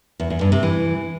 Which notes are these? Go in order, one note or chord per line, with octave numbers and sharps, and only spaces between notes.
E2
E2
G2
C3
E3